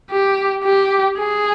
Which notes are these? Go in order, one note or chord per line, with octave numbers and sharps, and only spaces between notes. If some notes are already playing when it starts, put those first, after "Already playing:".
G4
G4
G#4